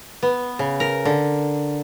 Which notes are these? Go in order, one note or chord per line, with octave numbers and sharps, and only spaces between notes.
B3
C#3
A#4
D3